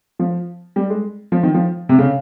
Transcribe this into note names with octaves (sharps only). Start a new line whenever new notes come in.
F3
G3
G#3
F3
D#3
F3
C3
C#3